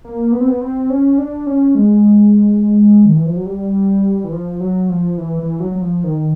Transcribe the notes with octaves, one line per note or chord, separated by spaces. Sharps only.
A#3
B3
C4
B3
C4
C#4
D4
C#4
G#3
D#3
E3
F3
F#3
G3
E3
F3
F#3
F3
E3
E3
F#3
F#3
F3
D#3